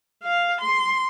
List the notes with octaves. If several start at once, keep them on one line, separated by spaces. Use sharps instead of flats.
F5
C6